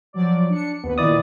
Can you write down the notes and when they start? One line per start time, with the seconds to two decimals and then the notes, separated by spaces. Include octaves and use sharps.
0.13 F3 F#3 D5
0.49 D4 C#7
0.84 D#2 B3 B4
0.98 A#2 D#3 E4 D5 D#5 D#6